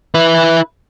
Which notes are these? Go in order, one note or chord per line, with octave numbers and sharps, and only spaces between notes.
E4 B4